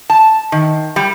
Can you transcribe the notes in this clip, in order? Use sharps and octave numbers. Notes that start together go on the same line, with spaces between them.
A5
D#3
G3